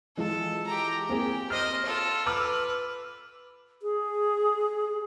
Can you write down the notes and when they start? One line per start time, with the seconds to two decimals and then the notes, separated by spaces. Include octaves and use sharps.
0.17 E3 G#3 F4 A4
0.67 G4 A#5
1.09 A#3 C4 G4 G#4
1.50 C5 D#5 F6
1.85 F4 A4
2.26 B4 D6 E6 F6
3.82 G#4